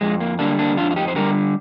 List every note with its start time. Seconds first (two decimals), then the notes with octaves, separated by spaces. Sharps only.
0.01 F2 G#3
0.21 A#3
0.39 D3 G3 A#3 D4
0.59 A#3 D4
0.77 F2 D4 F4
0.91 F4
0.96 D#4 G4
1.08 C5
1.15 D3 G3 G4 A#4